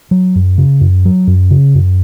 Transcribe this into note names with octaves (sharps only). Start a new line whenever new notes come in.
F#3
F#2
C#3
F#2
F#3
F#2
C#3
F#2